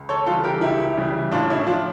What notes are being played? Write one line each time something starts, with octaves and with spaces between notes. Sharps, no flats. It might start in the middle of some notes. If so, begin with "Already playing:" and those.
Already playing: C#2
A4 C#5
C#3 E3 G3 F4 A4
G4 A#4
C#2 E4 G4
C#3 E3 G3
A2 D4 F4
C#4 E4
F3 D4 F4